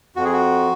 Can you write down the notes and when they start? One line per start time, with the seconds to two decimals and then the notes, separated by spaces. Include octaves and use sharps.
0.16 F2 F#4
0.25 G#4
0.33 F#4